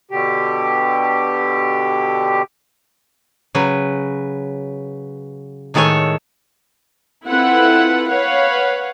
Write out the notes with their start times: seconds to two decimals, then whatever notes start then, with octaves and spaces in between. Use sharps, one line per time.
0.11 B2 D3 G4
3.55 C#3 F#3 B4
5.74 A2 D#3 G#3 A4 C#5 G#5
7.26 C4 E4 F4 A4 B4 F#5
8.08 B4 C#5 F5 F#5